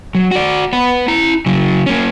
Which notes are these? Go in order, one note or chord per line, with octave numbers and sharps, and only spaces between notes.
F#3
F#4 D5
B3 B4
E4 A#5
C#3 F#3
A#3 C#4